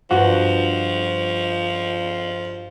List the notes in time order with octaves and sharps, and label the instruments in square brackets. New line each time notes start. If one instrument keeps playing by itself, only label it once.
[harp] G2 [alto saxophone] F3 [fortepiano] F#4